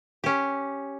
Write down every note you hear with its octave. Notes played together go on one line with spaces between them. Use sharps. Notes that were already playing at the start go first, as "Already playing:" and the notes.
C#4 G4